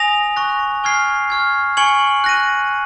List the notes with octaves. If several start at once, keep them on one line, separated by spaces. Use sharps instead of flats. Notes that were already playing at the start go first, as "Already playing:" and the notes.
Already playing: G#5 D#6 A#6 F7
C#6 F#6 A#6
G#5 C#6 F6 G#6 C7
C#6 F6 G#6
G#5 C#6 G#6 C#7 F#7
F#6 A#6 D#7